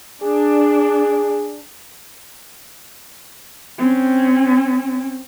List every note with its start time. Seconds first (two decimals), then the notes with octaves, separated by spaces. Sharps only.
0.23 D4 G#4
3.78 C4 C#4